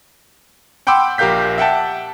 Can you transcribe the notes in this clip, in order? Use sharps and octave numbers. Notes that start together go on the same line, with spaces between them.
F#5 G5 B5 C6 D6 E6
A#1 G4 A#4 F5 G6 B6
E5 F#5 G5 A5